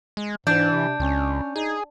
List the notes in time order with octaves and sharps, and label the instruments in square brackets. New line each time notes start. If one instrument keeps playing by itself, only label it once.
[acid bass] G#3
[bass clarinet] G#2 [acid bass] E3 [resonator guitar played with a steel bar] D4 [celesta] G6
[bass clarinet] C3
[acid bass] C#2 [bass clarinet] C#4
[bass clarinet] D#4 [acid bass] G#4